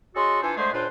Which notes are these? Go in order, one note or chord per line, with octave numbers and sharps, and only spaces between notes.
C#4 F#4 G#4 A4 D#5 C6
E3 D4 F4 A4 C5 G#5
D3 G#3 A3 G#4 C5
C#2 A#2 D4 F4 B4 C5